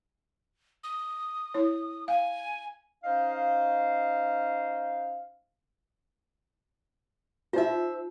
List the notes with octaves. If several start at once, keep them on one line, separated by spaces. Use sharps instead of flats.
D#6
E4 C#5
F5 G#5
C#4 D#4 C5 D#5 F5
D#4 F4 C5 E5